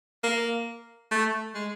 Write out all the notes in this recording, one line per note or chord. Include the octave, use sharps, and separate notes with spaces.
A#3
A3
G#3